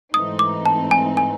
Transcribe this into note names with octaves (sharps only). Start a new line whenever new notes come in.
G#2 E3 A3 C4 D#4 D#6
D6
A5
G#5
G#5